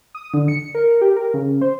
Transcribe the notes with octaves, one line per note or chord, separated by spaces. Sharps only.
D#6
D3
C#7
A#4
G4
A#4
C#3
C5